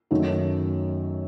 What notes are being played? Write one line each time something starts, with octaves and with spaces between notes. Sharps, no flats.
F#2 D#3 F#3 A3